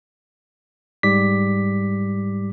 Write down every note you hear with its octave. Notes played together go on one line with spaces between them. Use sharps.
G#2 G3 D6 B6